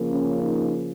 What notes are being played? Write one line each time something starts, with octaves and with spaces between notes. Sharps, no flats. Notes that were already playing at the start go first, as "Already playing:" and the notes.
Already playing: C#3 F3 A#3
C#4
D#4